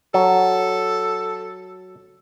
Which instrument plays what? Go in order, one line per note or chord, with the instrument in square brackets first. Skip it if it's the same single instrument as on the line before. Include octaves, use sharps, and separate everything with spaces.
[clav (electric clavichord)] F#3 [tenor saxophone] A4